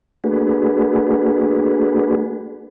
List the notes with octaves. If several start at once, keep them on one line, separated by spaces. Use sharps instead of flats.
A3 A#3 D4 F#4 G#4 B4